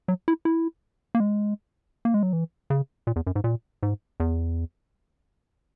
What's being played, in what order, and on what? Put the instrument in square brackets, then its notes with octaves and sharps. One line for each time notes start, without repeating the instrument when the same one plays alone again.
[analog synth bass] F#3
E4
E4
A#3
G#3
A#3
G#3
F#3
E3
C#3
A#2
E2
F#2
G#2
A#2
G#2
E2